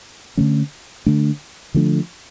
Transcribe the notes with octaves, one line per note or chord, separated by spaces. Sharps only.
D3 F3 A3 C#4
D3 A3 D4
D3 F3 A3 D4